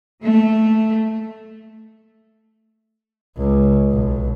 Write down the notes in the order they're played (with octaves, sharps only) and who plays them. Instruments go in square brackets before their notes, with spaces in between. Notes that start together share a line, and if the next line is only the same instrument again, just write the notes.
[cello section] A3
[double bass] C#2
B1